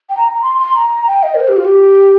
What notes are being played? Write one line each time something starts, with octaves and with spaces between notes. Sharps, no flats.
G5
A#5
A#5
C6
C6
A#5
G5
D#5
A#4
C5
G4
F4
G4